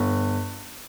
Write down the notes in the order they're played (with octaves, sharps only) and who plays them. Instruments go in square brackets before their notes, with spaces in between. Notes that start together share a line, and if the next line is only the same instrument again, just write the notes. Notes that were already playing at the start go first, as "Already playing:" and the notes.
Already playing: [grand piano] G1